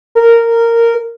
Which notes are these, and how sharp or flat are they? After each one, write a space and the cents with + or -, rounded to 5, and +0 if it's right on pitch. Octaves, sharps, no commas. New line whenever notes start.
A#4 -10